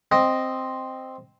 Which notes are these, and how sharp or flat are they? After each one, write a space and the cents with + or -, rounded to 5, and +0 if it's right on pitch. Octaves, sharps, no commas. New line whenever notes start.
C4 +0 D#5 +0